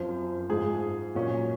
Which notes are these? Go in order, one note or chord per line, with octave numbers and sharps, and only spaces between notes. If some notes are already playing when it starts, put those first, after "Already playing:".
Already playing: F#2 F3 C4 C5
G#2 F3 G#3 G#4
A#2 F#3 C#4